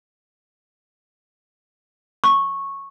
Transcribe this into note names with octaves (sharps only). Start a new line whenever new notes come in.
C#6